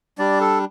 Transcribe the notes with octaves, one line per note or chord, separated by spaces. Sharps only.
G3 D4 D5
A4